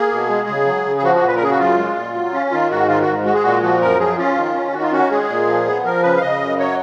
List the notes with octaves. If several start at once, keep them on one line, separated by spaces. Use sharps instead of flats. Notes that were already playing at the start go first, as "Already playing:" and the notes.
Already playing: A#3 G#4
B2
G#3
C#3
F#3
C#3
G#4
F3 F#4
F#4
A#2
B4
A#4
C#3 G#4
F#4
F#2 F4
G#3
A#2
F#3
C#4
D#3 F4
G#2 F#4
D#3 F4
F#4
G#2
G#3 F#4
G#4
A#2 F#4
F3 F#4
F#2 A#4
F3 G#4
C#4 F4
D#3
C#4
D#3 F#4
F4
C#4 F#4
G#3 G#4
A#2
F3
B3
F3 A#4
C#3 B4
F5
C#3 D#5
F#2
F#3 C#5